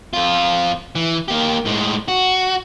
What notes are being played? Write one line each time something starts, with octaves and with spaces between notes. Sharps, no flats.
F2 F4
E3
A#3 G4
A2 G#3
F#4